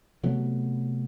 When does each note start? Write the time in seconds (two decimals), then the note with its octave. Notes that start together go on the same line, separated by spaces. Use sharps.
0.23 C3 F#3 A3 B3